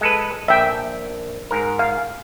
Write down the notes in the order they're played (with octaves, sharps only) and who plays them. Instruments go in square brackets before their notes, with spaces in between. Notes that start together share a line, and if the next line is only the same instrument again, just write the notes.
[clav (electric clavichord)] G#3 A4 B4
[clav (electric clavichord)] A#1 [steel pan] E5 G5
[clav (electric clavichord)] G#2 A#4
[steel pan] F5